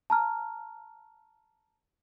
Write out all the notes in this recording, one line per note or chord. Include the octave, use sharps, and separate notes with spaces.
A5 A#5 F6